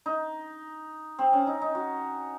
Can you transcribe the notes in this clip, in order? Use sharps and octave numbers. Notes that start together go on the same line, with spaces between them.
D#4
C4
C#4
D#4
D#4
F#4